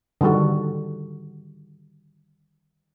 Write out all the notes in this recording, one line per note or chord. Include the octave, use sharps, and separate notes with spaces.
D3 D#3 G3 F#4 A4